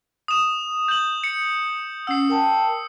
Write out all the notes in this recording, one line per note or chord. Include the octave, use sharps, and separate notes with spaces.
D#6 E7
G6 F#7
C#7
C#4 F#5 E6 C7
A#4 G5 A5